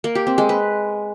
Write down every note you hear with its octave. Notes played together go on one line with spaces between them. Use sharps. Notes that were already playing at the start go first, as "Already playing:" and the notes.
A#3
G4
C4
G#3
B4